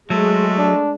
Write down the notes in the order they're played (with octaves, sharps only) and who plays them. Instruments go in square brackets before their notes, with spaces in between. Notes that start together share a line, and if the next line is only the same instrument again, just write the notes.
[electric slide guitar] F#3 [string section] G#3 [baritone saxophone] A3
[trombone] D4